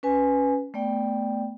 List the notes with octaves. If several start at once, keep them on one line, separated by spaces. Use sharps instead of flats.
C#4 B4 G#5
A3 B3 D5 G5